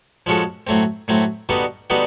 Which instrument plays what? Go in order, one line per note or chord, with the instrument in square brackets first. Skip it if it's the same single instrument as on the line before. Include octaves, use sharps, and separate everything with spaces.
[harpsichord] F3 G#3 C#4 F#4 A4
A2 F#3 A3 C4
A2 F#3 A3 C4
D3 G3 B3 D#4 F#4
D3 G3 B3 D#4 F#4